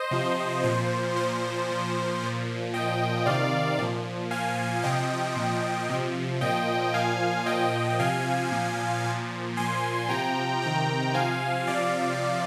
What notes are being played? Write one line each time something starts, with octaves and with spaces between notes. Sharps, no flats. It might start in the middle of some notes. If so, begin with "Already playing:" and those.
Already playing: C5 D#5
C3 F3
A#2 F3 C5
A#2 F3 C5
A#2 F3
A#2 F3
A#2 F3 D#5 G5
C3 D#3 D5 F5
A#2 F3
A#2 F3 F5 G#5
C3 F3 D#5 G5
A#2 F3
C3 F3
A#2 F3 D#5 G5
A#2 F3 F5 G#5
A#2 F3 D#5 G5
C3 F3 F5 G#5
A#2 F3
A#2 F3
A#2 F3 G#5 C6
C3 F3 G5 A#5
C3 D#3 G5 A#5
C3 F3 F5 G#5
C3 F3 D5 F5